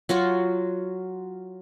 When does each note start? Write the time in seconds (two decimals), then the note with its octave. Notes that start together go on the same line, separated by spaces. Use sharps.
0.09 F#3 F4 F#4